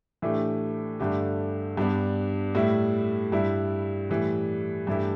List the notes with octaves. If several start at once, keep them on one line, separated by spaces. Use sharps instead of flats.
A2 E3 A3 D4 G4
G2 D3 A3 G4
G2 G3 B3 D4
A2 G3 E4
G2 G3 E4
A2 E3 G3
G2 E3 A3 E4 G4